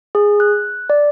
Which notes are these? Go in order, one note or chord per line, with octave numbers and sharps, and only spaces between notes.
G#4
F#6
D5